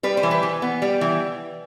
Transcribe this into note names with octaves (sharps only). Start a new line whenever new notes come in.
G3 B4
C5
E3
B4
E3
B3
G3
E3